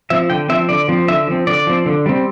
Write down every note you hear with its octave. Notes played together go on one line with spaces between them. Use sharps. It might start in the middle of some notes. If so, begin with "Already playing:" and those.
F3 C4 E5
D3 G5
F3 C4 E5
D3 D5
F3 C4
D3 E5
F3 C4
D3 D5
F3 C4
D3
G3 C4